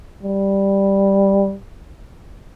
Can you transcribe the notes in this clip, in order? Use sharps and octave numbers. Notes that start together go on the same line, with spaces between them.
G3